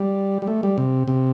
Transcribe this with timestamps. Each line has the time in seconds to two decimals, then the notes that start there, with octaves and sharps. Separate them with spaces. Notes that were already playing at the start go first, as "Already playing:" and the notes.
Already playing: G3
0.42 G3
0.47 A3
0.63 G3
0.78 C3
1.08 C3